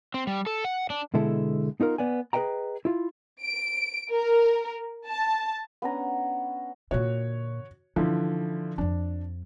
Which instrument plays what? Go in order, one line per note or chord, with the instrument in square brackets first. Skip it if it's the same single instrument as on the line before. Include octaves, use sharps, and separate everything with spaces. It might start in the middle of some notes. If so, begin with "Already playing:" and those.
[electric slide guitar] C4
G3
A4
F#5
D4
[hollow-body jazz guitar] B2 D3 G#3 E4 A4
B3 D#4 F4 A#4
B3 D5 G#5
G#4 B4 C#5 D#5 G5 A#5
E4 F4
[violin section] D7
A#4
A5
[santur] B3 C#4 D4 A#5
[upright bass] A#2 D3 [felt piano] F#4 C#5
[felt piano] D3 E3 F3 [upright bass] D#4
[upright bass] F2 F3 [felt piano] D4